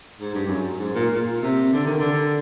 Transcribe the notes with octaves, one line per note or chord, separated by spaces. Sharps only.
G#2
G2
F#2
G#2
A#2
A#2
C3
D3
D#3
D3